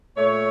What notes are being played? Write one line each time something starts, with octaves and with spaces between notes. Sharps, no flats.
A#2 A3 C#5